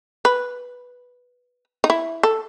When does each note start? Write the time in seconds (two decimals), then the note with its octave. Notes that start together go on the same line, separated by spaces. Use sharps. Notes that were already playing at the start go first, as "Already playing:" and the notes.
0.25 B4
1.84 D#4
1.90 E4
2.23 A4